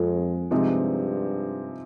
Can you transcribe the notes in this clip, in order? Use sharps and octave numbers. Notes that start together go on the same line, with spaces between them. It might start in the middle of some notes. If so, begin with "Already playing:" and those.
Already playing: F2 G#3
G2 C3 F3 G#3 C4 D#4